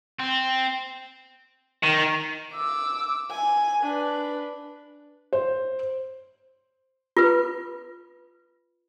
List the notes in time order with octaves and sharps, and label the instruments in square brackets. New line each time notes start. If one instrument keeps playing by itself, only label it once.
[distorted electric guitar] C4
[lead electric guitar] D#3
[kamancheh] D6 E6
G#5
D4 B4
[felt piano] C5
[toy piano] F4 B4